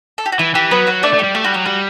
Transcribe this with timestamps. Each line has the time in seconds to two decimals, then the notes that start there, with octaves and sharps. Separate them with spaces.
0.18 A4
0.26 G4
0.32 F#4
0.39 E3 E4
0.55 E3 G4
0.71 F#3 B3 B4
0.87 F#4 F#5
1.03 A3 D4 D5
1.13 A3
1.19 G3 G4
1.35 A3 G4
1.44 G3 F#4
1.54 F#3 G4
1.66 G3 F#4